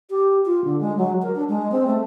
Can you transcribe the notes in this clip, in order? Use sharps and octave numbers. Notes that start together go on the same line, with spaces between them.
G4
F4
D3
G#3
F#3
A#4
D4
G#3
C4
A3